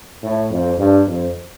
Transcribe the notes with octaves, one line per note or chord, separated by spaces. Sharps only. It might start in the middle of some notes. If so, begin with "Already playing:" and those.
A2
F2
G2
F2